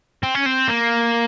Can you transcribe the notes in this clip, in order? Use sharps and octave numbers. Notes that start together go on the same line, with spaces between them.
C4
C#4
C4
A#3